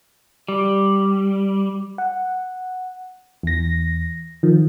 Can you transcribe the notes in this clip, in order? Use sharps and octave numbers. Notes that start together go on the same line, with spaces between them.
G3
F#5
E2 A#6
D#3 F3